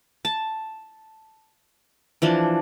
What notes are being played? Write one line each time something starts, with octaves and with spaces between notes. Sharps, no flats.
A5
E3 F3 D4